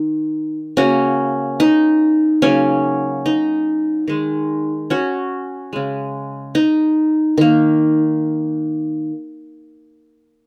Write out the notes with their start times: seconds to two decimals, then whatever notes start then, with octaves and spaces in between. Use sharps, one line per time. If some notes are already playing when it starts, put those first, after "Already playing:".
Already playing: D#3 D#4
0.77 C#3 A#3 C#4 F#4
1.60 D#4
2.42 C#3 F#3 A#3 C#4
3.26 D#4
4.08 D#3 G#3
4.90 C#4 F#4
5.73 C#3 G#3
6.55 D#4
7.38 D#3 A#3